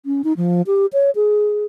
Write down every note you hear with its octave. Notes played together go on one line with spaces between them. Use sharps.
C#4
D#4
F3
G4
C#5
G#4